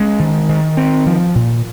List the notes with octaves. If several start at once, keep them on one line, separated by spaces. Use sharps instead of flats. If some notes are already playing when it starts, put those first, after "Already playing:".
Already playing: G#3 C#4
D#3
D#3
C4
F3
A#2